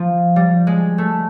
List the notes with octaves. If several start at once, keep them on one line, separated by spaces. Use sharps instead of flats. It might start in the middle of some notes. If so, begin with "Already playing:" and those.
Already playing: F3
G3
G#3
A3